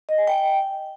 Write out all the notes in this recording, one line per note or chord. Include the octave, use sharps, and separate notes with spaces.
D#5
G#5
G5